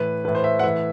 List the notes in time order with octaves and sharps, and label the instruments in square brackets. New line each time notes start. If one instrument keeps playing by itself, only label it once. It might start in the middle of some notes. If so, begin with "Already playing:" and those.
Already playing: [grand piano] A2 E3 B4
A2 E3 B4
C5
E5
F#5
A2 E3 E5